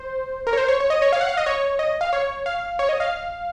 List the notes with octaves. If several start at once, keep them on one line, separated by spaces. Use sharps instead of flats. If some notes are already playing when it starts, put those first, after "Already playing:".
Already playing: C5
A#4
C#5
C5
C#5
C#5
D#5
C#5
F5
F#5
F5
D#5
C#5
D#5
F5
C#5
F5
C#5
D#5
F5